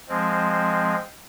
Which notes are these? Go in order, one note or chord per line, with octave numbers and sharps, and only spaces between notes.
F3 G#3 C4